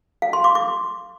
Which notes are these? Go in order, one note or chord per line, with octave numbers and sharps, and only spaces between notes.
F5
C6
D6
D6